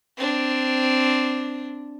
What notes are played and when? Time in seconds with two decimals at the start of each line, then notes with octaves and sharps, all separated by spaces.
0.17 C4 D4